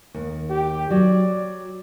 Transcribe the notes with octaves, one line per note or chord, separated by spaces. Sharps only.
D#2
G4
F#3 D5